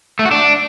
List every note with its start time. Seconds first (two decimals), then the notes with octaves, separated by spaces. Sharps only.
0.19 A3
0.25 F#4
0.31 D4